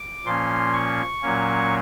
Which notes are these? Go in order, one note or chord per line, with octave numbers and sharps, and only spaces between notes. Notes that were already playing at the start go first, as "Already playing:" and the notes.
Already playing: D6
A#2 F3 A#3 C#4 C6
C#6
A#2 F#3 A#3 C#4